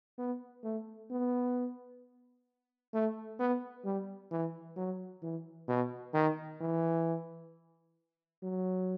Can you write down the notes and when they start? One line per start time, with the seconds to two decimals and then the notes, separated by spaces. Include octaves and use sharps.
0.18 B3
0.64 A3
1.11 B3
2.94 A3
3.40 B3
3.85 G3
4.31 E3
4.77 F#3
5.23 E3
5.68 B2
6.14 D#3
6.61 E3
8.43 F#3